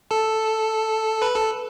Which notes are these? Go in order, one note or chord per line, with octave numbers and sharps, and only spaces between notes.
A4 A5
B4 B5
A4 A5